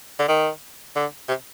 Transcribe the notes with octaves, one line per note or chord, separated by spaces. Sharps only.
D3
D#3
D3
C3